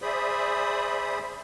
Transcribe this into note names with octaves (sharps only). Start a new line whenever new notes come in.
G#4 C5 D5 E5 B5 D#6